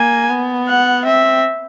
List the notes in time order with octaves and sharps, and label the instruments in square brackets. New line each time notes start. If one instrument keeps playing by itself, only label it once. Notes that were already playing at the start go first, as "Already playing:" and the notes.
Already playing: [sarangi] A#3 [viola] G#5
[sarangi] B3
[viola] F#5
[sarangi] C4 [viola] E5